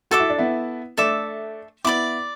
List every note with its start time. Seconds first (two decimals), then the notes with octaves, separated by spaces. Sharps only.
0.11 F#4 A4 E5 D6
0.20 E4
0.30 D4
0.38 B3 E4
0.97 A3 D4 A4 E5 D6
1.85 B3 E4 D5 B5 D6